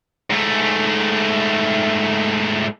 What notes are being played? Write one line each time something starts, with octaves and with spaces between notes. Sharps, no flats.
G#2 A3